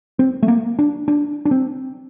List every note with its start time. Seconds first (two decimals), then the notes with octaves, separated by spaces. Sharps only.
0.19 C4
0.43 A3
0.48 A#3
0.79 D4
1.08 D4
1.45 D4
1.51 C4